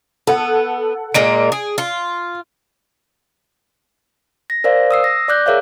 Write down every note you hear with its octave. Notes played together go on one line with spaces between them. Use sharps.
B3 A4 F#5
A#2 G#3 A#3 D7
G#4
F4
A#6
A#4 C5 D5 F5
D#6 E6 C7
A#6
D5 D6 F#6 G6
G#4 A#4 C#5 E5 F5